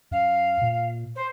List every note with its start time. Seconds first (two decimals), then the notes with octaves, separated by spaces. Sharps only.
0.11 F#2 F5
0.61 A#2
1.15 C5